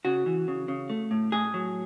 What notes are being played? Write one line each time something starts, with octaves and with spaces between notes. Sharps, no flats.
C#3 F#4
E3
C#3
C#3
A3
A2
A2 G#4
F#3